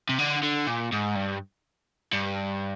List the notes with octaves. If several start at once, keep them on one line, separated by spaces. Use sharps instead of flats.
C3
D3
D3
A#2
G#2
G2
G2